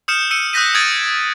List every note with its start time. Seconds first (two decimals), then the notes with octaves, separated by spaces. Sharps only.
0.08 D#6 F6 G6 C#7 E7
0.31 E6 C#7 D#7
0.53 D#6 F#6 G6 A#6 B6 D#7
0.75 D#6 G#6 A6 D7